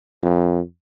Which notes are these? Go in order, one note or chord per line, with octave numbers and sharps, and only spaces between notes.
F2